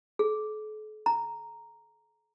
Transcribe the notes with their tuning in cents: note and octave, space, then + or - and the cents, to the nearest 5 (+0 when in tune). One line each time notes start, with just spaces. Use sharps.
A4 -45
A#5 -5